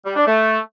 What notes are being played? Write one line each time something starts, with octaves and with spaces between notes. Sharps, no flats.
G3
D4
A3